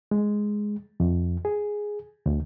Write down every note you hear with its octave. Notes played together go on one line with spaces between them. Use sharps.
G#3
F2
G#4
D2